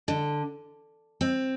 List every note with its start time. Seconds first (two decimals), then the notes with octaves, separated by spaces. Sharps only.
0.08 D3
1.21 C4